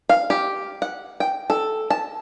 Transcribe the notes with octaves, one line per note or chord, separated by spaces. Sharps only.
F5
G4
F#5
G5
A4
A5